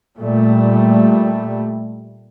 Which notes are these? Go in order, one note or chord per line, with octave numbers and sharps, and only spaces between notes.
A#2 G3 A3